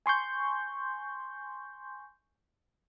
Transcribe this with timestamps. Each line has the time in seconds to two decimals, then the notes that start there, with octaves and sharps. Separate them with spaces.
0.06 G#5 C6 C#6 G6